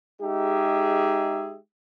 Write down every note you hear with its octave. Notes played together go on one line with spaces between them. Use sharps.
G#3 D#4 G4 G#4 E5